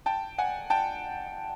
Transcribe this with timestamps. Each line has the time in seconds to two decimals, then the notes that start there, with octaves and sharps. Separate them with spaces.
0.06 G5 A5
0.38 F#5 G#5
0.70 G5 A5